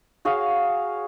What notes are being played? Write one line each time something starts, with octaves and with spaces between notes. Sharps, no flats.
F#4 G#4 C#5 F5